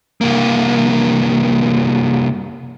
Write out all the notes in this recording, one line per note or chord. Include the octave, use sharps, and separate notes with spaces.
C2 A#3